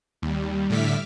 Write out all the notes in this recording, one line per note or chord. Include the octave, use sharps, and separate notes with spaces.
D#2 G3
A2 D3 E5 D6 F6 B6